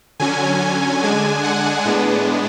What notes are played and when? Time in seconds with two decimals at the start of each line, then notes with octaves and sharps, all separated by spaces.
0.20 D3 F#3 C#4 G#5
1.02 D3 G#3 D4 G#5
1.44 F#5
1.85 A2 G#3 B3 D4